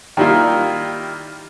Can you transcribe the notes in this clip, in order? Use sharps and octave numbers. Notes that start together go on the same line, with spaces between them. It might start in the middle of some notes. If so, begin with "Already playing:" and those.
D#3 G3 A#3 E4 F4